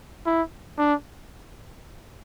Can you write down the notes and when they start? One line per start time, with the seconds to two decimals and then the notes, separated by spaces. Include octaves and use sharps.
0.26 E4
0.78 D4